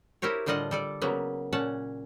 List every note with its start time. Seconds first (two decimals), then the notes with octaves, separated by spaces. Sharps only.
0.22 E4 G4 A#4 C5 C#5
0.46 A2 D3 G3 F4 D#5 F#5
0.71 G3 A4 D5
1.01 C#3 F#3 A#3 B3
1.53 A#2 C#4 F#5 A5